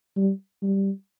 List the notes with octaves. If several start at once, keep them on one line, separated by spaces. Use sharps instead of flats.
G3
G3